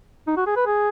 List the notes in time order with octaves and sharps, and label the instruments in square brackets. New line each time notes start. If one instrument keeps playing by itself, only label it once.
[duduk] D#4
F#4
G#4
B4
G#4